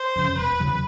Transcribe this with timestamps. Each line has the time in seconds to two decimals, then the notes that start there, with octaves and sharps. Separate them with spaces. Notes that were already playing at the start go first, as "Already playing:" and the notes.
Already playing: C5
0.16 F2 C#3
0.37 E1 B4
0.60 E2 C#3 F#3